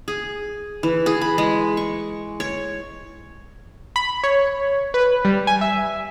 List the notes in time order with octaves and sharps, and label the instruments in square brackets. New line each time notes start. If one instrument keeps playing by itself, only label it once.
[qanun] G#4
E3
G#4
B5
G#3
C#6
C#5
[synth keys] B5
C#5
B4
G3
G#5
E5